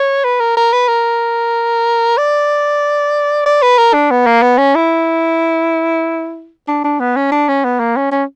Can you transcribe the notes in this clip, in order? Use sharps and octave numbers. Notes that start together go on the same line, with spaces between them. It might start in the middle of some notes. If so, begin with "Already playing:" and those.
Already playing: C#5
B4
A#4
A#4
B4
A#4
D5
D5
B4
A#4
D4
B3
A#3
B3
C#4
E4
D4
D4
B3
C#4
D4
C#4
B3
A#3
C#4
C#4